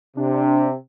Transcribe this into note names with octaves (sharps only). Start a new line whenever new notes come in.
C3 D4